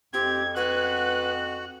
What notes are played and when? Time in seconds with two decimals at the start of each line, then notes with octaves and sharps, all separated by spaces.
0.14 F2 C4 G4 G#6
0.56 F#4 B4 F#5 F#6